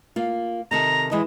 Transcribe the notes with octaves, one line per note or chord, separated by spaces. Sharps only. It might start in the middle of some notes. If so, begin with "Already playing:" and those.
A#3 F4
C3 D#3 A4 A#5
E3 G#3 D#5